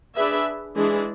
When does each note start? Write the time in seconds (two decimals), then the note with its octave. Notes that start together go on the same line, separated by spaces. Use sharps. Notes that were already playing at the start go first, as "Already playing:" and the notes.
0.16 D4 G#4 B4 E5
0.75 E3 G#3 D4 G#4